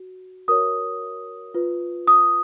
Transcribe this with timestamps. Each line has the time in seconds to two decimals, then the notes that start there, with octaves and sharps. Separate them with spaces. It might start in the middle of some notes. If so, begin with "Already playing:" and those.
Already playing: F#4
0.48 F#4 A#4 C#5 D#6
1.54 F4 B4
2.08 D#6